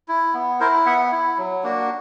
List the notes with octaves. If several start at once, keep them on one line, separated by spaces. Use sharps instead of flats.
E4
B3
E4 A#4 C5
B3 E5 F#5
E4
F#3
A#3 D4 F#4